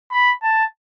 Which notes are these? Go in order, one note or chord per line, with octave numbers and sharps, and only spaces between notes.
B5
A5